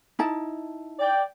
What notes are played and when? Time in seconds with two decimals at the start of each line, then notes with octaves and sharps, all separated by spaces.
0.19 D#4 E4 A5
0.99 D5 G5